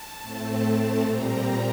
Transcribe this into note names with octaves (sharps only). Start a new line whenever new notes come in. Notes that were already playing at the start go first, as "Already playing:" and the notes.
Already playing: A5
A2 A3 C4
A#2 G3 C4 A#5